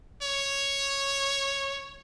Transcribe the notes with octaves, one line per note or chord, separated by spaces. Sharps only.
C#5